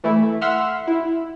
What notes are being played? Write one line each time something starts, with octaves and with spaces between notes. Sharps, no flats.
E3 A3 E4
E5 F#5 C6 E6 F6
E4